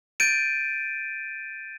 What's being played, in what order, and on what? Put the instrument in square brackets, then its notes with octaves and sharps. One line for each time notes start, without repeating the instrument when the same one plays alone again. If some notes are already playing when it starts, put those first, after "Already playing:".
[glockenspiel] G6 A6 D7 D#7